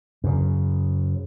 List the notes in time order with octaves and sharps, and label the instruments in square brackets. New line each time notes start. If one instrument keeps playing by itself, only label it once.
[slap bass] F#2 C#3